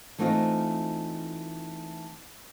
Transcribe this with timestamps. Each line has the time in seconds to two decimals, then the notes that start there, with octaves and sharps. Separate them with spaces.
0.18 E3 A3 C4 D#4 F4 D#5